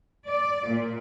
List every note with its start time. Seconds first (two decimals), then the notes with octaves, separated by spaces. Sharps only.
0.27 D5
0.67 A#2